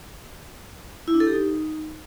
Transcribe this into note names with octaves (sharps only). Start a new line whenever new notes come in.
E4
D4
A4
G4
D#4